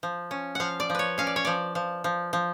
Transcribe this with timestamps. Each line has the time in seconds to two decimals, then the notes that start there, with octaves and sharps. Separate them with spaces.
0.03 F3
0.31 C#4
0.55 F3 F5 F#5
0.80 D5
0.90 F3
0.95 B4 C#5
1.18 C#4 F5
1.27 D5
1.36 C#5
1.45 F3 D5
1.75 F3
2.04 F3
2.33 F3